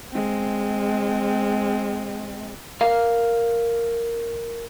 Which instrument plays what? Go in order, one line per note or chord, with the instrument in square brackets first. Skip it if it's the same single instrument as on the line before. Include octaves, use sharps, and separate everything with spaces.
[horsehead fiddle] G#3 C4
[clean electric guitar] A#4 F5